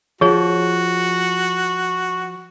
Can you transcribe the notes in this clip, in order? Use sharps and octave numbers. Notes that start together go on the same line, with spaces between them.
F3 F#4 G#4 C#5